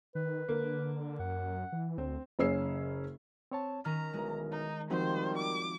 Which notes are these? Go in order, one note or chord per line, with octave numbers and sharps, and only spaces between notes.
D#3 B4
D3 A#3
F#2 F#5
E3
D2 C4
F#1 C#3 C#4 G#4 E6 C7
C4 C#5 A5
D#3 C#4 A#5 F6
B1 E3 G#3 A#4
D#4
D#3 F3 G3 C4 D#4 F#4 C5
D6